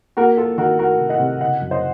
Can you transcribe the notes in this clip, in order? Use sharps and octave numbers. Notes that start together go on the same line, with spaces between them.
A#3 F#4 A#4
F4 A4
D#3 F#4 A#4
A3 F#4 A#4
C3
D#5 F#5
C3
C#3 D#5 F#5
F#2
C5 D#5